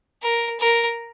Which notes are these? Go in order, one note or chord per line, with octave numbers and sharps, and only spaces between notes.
A#4
A#4